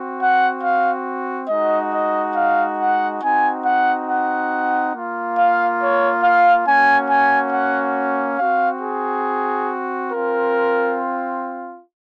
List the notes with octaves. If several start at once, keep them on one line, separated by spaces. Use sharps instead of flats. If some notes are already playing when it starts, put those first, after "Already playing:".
Already playing: C4 F#4
F#5
F5
G#3 D#4 F#4 D#5
D#5
F5
F#5
C4 D#4 F#4 G#5
F#5
F#5
A#3 F4
F5
C#5
F5
A#3 C#4 F#4 G#5
G#5
F#5
C4 F#4 F5
G#4
C4 F4 A#4